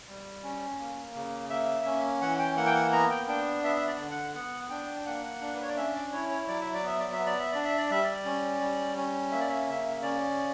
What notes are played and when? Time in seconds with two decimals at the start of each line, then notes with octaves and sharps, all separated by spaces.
0.08 G3
0.44 C#4
0.79 A#3
1.15 C#3
1.50 A#3 E5
1.86 C#4
2.21 E3 F#5
2.39 G5
2.56 A#3 F#5
2.66 G5
2.74 F#5
2.92 B3 A#5
3.10 G5
3.28 D4 G5
3.64 B3 E5
3.75 E5
3.87 D5
3.98 D3
4.11 F#5
4.34 B3 F#5
4.70 D4 G5
5.00 G5
5.06 A#3 F#5
5.41 D4
5.55 B4
5.62 C#5
5.69 D5
5.76 C#4 E5
5.94 D5
6.12 E4 C#5
6.30 C#5
6.48 F#3 D5
6.61 E5
6.74 D5
6.83 B3 E5
6.99 D5
7.13 E5
7.19 B3
7.26 D5
7.39 E5
7.52 D4 D5
7.65 E5
7.78 D5
7.90 G3 E5
8.04 D5
8.25 C#4
8.61 G3
8.96 C#4
9.32 A#3 E5
9.40 D5
9.49 E5
9.68 C#3 E5
10.03 C#4 D5